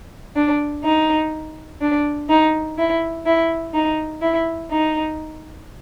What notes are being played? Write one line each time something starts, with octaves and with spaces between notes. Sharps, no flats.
D4
D#4
D4
D#4
E4
E4
D#4
E4
D#4